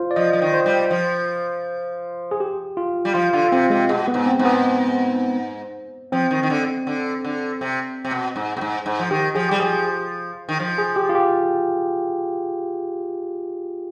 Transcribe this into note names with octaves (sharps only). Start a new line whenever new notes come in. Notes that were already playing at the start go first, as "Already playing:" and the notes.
Already playing: F4 C5
D5
F3 D#5
F3
D#3
C5
G3
F3
G#4
G4
F4
G3
F3 F4
D3 F4
C3 C4
C3 G#3
B2 G#3
B3
G#2
C4
G#2
B3
F3 C4
D#3
D#3
D3
D3
D3
C3
C3
B2
G#2
B2
G#2
G#2
F3
D#3 G4
F3 G#4
G3 G4
F3 G#4
D#3
F3
G#4
G4
F4
G4